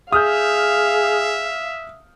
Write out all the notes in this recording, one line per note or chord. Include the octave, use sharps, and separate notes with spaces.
G#4 E5 F5 D#6 F6 G6